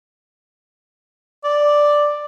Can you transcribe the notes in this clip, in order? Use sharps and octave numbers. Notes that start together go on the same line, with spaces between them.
D5